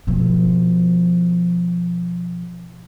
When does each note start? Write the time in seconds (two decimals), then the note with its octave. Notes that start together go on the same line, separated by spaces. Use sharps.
0.07 B2 F3